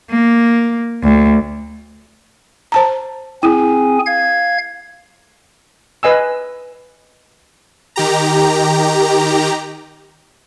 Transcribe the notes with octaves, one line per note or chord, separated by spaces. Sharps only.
A#3
D2
C5 A5 A#5
C4 E4 G#4 G#5
F5 G#6
B4 D#5 G#5 E6
D#3 G4 A#5